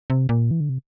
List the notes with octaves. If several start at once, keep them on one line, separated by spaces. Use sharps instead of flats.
C3
A#2
E3
D3
C3